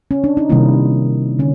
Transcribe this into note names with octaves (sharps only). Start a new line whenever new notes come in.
C#4
D4
D#4
C3 D#3 G3 A#3 E4
D3 C#4